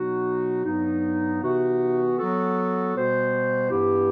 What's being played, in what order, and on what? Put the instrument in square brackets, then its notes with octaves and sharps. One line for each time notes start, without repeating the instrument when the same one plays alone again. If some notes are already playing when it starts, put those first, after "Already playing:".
Already playing: [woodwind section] B2 F#3 B3 D#4 F#4
G2 F#3 B3 D#4
C3 E3 B3 D#4 F#4
F#3 B3 F#4 A4
B2 G3 B3 F#4 C5
G2 E3 B3 E4 G4